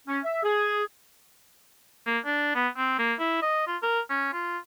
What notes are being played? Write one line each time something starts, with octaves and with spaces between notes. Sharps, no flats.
C#4
E5
G#4
A#3
D4
B3
C4
A#3
E4
D#5
F4
A#4
C#4
F4